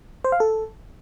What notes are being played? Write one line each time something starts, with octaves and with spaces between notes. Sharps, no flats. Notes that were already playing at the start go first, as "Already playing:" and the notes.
C5
F5
A4